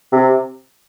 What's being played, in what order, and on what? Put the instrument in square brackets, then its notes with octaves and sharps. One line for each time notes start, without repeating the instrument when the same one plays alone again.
[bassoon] C3